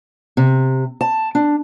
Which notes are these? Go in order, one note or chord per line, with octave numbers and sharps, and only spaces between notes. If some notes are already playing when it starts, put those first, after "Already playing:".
C3
A5
D4